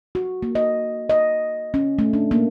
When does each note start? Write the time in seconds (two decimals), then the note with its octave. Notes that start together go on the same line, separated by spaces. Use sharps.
0.15 F#4
0.43 A#3
0.55 D#5
1.10 D#5
1.74 C#4
1.99 A3
2.13 D4
2.31 A#3